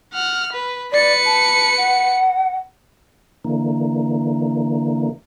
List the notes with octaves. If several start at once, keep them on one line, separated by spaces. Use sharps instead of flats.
F#5 F6
B4
B4 D5 C#7
A5
F#5
D3 E3 A#3